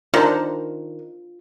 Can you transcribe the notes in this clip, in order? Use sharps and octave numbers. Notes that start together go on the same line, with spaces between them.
D#3 D4 F4 A#4 C5